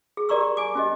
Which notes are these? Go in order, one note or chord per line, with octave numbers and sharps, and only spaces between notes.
G#4
G4 A#4 D5 A#5 C#6 E6
G#5 D6
C#4 G4 D#5